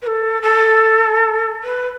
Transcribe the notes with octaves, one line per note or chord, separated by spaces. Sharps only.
B4
A4
A4
B4